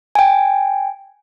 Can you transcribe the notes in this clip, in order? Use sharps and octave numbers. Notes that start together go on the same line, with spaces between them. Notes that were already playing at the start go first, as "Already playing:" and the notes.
G5 G#5